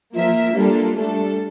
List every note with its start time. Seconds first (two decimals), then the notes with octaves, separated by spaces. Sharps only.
0.15 F3 A#3 F4 A#4 E5
0.56 G3 A#3 D4 F4 A4
0.97 G3 A3 D4 A4